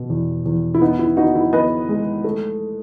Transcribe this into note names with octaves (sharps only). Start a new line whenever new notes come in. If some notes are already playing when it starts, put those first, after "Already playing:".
Already playing: B2
E2
E2
E4
B3 D#4
E4
B3 D#4 F#4
E4
B3 B4 D#5
G#3
A3